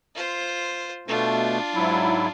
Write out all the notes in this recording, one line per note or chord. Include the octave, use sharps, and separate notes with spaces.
F4 C5
B2 A3 D4 F4
G#2 F#3 E4